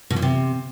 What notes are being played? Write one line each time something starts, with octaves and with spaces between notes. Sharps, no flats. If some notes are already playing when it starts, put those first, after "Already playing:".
B2
A#2
C3